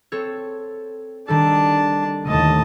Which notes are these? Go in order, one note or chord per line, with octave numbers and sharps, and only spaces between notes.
C4 A4 C#5
D#3 G3 D4 A4 A5
D#2 A2 D3 A3 D#5 A5